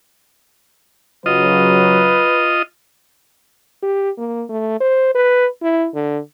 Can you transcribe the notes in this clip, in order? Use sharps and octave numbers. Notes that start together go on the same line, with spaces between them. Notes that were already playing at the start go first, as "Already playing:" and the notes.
C#3 F#3 F4 B4 D#5
G4
A#3
A3
C5
B4
E4
D3